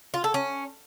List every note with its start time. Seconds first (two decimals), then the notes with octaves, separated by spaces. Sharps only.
0.14 F4
0.24 A4
0.34 C#4